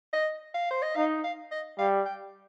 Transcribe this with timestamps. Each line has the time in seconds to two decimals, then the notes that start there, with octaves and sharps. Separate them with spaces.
0.13 D#5
0.54 F5
0.70 C5
0.82 D#5
0.96 D#4 F5
1.24 F5
1.51 D#5
1.78 G3 F5
2.06 G5